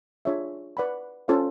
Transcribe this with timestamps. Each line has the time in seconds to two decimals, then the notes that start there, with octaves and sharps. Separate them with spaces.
0.25 D4 F4 G#4 C#5 E5
0.77 B4 D5 F#5 B5
1.28 C#4 F4 A4 C5 F5